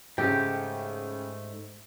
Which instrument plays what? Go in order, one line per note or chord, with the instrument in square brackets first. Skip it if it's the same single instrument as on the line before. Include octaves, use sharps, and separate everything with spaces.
[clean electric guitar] G#2 A3 [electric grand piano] C#3 G5 [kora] G4